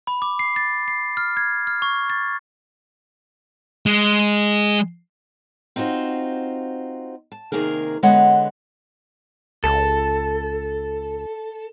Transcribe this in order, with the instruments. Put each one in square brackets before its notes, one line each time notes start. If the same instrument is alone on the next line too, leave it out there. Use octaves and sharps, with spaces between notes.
[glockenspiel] B5
D6
C7
A6
C7
F6
G#6
F6
C#6
A6
[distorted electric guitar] G#3
[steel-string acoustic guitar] C4 D#4 F4 F#4 C5
A5
C3 D#3 A#3 G#4 A#4
D3 G#3 B3 C#5 D#5 F#5
[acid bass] C#2 [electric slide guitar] A4